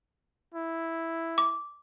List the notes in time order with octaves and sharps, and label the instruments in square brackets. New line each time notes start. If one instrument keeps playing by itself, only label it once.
[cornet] E4
[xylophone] D6